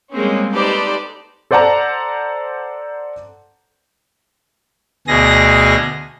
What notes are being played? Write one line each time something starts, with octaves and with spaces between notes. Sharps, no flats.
G3 G#3 A#3 C4 C#4
D#4 G4 A4 B4 C5 D5
A4 C5 D5 F#5 A5 A#5
D2 B2 G#4 A#6